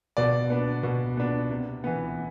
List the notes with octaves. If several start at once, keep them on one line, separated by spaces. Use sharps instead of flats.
B2 D5
B3 D4
B2
B3 D4
C3
E3 B3